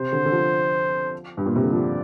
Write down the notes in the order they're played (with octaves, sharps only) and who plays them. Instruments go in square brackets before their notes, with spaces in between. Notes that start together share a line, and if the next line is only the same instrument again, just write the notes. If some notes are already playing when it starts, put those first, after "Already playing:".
Already playing: [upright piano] C3 [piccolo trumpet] C5
[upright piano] D3
D3
F3
G2
A#2
C3
D3
[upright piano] F3 [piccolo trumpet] D5